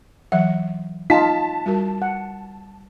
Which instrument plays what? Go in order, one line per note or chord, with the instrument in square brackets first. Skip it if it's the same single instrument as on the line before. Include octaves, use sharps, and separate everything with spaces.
[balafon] E3 F#3 E5 [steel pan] F#5
[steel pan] D#4 F4 [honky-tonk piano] A5 B6
[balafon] G3 F#4 A#4
[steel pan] F#5